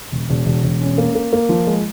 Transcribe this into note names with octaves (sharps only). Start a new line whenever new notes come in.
E1
E1
E1
E1
C#4
A#3
A#3
A#3
F3
G#3